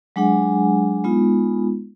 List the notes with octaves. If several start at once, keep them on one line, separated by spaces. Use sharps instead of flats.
F#3 G#3 D4 G#4 F#5 G#5
G#3 B3 D#4 F4